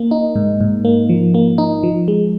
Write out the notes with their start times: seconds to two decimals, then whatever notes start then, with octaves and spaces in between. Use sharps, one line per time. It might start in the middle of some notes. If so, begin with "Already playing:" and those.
Already playing: A#3
0.11 D#4
0.36 G#2
0.61 G#2
0.85 A#3
1.09 F3
1.34 A#3
1.58 D#4
1.83 F3
2.08 G#3